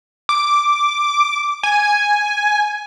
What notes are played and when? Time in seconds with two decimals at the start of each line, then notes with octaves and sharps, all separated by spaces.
0.29 D6
1.63 G#5